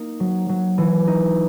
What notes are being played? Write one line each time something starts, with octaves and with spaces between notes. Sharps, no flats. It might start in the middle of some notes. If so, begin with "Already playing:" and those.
Already playing: A#3 D#4
F#3
F#3
E3
D#4